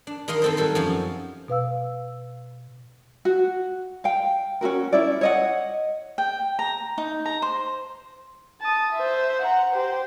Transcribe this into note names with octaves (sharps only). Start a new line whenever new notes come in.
D4
D#3 D#4 A#4 F5 C6
D#3 C4 A4 A#4 C5
F#3 G3 A4 C5
F#2 F3 F4
B2 B4 F5 E6
F#4
F5 G5
C#4 F4 F#4 A#4
C#4 E4 D5
C#5 D#5 F#5
G5
A#5
D#4
A#5
C5
A5 D#6
C5 E5
F#5 A#5
G4 C5